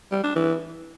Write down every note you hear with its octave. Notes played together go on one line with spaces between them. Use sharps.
G3
D4
E3